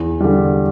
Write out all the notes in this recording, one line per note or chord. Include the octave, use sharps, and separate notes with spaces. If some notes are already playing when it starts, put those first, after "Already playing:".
Already playing: E2
D3 G3